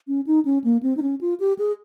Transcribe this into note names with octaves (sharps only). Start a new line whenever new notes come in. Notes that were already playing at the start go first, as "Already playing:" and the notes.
C#4
D#4
C#4
A#3
C4
D#4
C#4
F4
G4
G#4